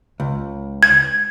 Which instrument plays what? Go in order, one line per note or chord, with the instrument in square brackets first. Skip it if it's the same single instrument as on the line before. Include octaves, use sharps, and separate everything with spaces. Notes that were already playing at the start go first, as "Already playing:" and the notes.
[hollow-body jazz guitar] C#2
[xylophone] G#6